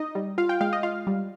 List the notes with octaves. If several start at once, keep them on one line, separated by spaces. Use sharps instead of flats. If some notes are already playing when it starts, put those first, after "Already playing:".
Already playing: D#4 D#5
G3
F4 F5
G5
G#3 F5
D#5
F4 F5
G3